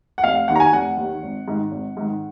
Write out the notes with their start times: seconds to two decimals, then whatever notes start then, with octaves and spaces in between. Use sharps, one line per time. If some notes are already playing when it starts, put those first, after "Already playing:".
0.18 F#5
0.24 F1 F5
0.48 D#2 D#3 F#5
0.56 A#5
0.60 G#5
0.72 F1 F#5
0.97 D#2 D#3
1.23 G#1
1.48 G#2 D#3
1.71 G#1
1.97 G#2 D#3